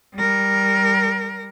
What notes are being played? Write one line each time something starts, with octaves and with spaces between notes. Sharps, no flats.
G3 A#4